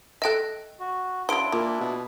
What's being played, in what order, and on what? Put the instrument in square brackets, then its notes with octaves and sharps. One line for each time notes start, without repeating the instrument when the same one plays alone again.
[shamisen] A4 E5 [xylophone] D#5 G5 F#6
[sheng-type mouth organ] F#4
[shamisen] C#3 F#3 [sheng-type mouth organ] D4 E4 [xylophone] C6 D7
[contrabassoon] A#2 [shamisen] A#3
[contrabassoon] B2